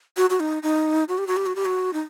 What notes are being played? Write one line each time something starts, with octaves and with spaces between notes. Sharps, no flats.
F#4
F#4
D#4
D#4
F#4
G4
F#4
G4
F#4
G4
F#4
D#4